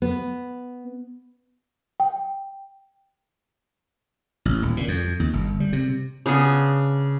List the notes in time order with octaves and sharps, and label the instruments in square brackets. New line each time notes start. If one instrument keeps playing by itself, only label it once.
[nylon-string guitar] B3
[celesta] G5
[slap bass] A1
D#1
A#2
F2
D#2
G1
G3
C3
[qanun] C#3 B3 D4 G#4